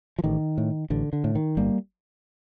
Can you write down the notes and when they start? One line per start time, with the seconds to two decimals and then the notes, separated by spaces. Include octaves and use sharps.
0.19 F3
0.24 A1 D#3
0.58 A2
0.90 A1 D3
1.13 D3
1.24 A2
1.35 D#3
1.57 G1 G3 A#3